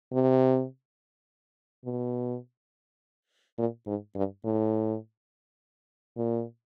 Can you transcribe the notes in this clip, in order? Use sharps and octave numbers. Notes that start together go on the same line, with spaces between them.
C3
B2
A#2
G#2
G2
A2
A#2